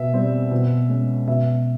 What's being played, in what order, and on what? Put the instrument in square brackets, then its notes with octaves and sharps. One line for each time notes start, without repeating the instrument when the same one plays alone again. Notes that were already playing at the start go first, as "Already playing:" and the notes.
Already playing: [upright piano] B2 E5
G3 C4
B2
G#3 C#4
B2 E5